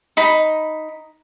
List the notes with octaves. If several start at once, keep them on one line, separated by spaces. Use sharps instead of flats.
D#4 B5